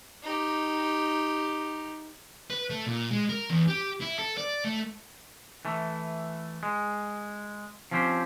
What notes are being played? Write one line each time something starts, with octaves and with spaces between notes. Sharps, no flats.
D#4 G4
B4
A3
A#2
G#3
A#4
E2
G4
E4
A4
D5
A3
E3 A3
G#3
F3 C4 C#4 G4 C5